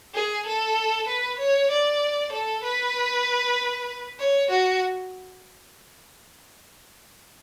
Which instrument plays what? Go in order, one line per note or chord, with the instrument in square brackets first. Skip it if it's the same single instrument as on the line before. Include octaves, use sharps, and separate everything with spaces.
[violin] G#4
A4
B4
C#5
D5
A4
B4
C#5
F#4